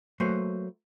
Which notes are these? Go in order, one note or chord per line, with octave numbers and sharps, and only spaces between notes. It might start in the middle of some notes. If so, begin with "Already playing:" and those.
F#3 A3 A#3 B4 C5